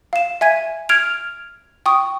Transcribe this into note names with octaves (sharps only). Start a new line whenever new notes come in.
F5 E7
E5 G#5 G#6 D#7
F6 G#6 D7 F7
G5 C#6 D#6